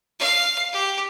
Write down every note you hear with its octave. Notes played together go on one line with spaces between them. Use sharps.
F5
G4